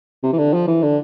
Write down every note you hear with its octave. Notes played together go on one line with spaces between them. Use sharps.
C3
E3
D3
F3
E3
D3